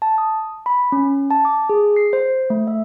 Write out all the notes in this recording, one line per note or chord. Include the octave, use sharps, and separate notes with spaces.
A5
D#6
B5
C#4
A5
D6
G#4
C7
C5
A3
E5